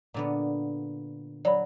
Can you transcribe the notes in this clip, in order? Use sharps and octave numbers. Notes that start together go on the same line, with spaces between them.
A#2 D3 B3
F#3 D5 B5